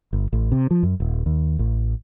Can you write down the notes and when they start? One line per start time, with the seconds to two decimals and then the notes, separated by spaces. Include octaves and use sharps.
0.13 G1
0.33 A1
0.52 C3
0.71 F3
0.83 F#2
1.00 D#1
1.26 D#2
1.59 A1